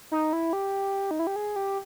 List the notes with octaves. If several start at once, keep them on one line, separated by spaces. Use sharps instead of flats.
D#4
E4
G4
D#4
E4
G4
G#4
G4